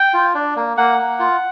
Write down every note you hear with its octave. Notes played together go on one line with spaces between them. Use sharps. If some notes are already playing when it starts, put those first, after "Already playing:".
Already playing: G5
F4
D4
A#3
A#3 F#5
A#3
F4